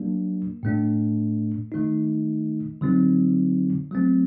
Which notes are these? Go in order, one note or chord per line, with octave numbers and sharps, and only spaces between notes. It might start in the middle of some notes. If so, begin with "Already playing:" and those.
Already playing: F#3 A#3 D4
A2 A3 D4
D#3 A3 D#4
D3 F#3 C4 D#4
F#3 A3 C4